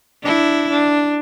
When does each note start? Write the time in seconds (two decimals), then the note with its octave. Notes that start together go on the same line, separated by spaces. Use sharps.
0.23 D4 E4
0.70 D4